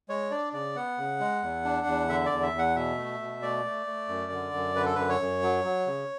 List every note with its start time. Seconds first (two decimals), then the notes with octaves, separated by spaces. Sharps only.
0.09 G#3 C#5
0.31 D4 D5
0.53 C#3 D5
0.76 B3 F#5
0.98 C#3
1.20 G#3
1.43 E2
1.65 D4
1.87 E2
2.09 D3 E5
2.26 D5
2.31 E2
2.43 E5
2.53 E2
2.59 F#5
2.76 B2 E5
2.98 A3
3.20 B2
3.42 A3 D5
3.65 A3
3.87 A3
4.09 F#2
4.32 D3
4.54 F#2
4.76 D3 B4
4.86 A4
4.95 F#2 B4
5.09 C#5
5.20 F#2
5.42 F#3
5.64 F#3
5.87 C#3